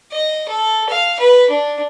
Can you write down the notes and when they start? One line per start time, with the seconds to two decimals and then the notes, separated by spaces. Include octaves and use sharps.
0.12 D#5
0.48 A4
0.89 F5
1.19 B4
1.49 D4